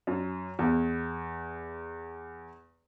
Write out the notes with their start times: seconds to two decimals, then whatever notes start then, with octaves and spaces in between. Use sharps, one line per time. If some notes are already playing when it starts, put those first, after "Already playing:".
0.07 F#2
0.59 E2